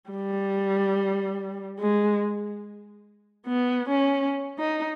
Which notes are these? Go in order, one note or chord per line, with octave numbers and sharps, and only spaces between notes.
G3
G#3
B3
C#4
D#4